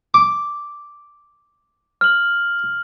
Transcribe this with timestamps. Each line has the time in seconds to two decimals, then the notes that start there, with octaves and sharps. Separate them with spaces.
0.14 D6
2.01 F6 F#7